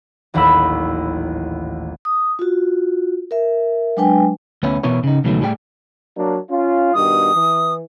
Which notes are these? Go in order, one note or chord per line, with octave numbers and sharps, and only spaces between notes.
D#1 A1 D#2 F#3 B5 E6
D#6
F4 F#4
A#4 E5
F#3 G#3 D4 B4 G5 G#5
D2 B3 C#4 E4
B2 E3 B3 E4 A#4 C#5
C#3 D#4
C#2 B2 D#3 E3 F#3 A3
A2 G3 G#4 B4 G5
F#3 A#3 D4
C#4 F4
G2 B2 D#3 D#6
E3